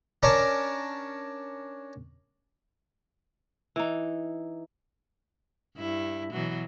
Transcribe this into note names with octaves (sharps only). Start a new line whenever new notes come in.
C#4 D4 A#4 A5
E3 D#4
G2 E4
B2 E3 F#3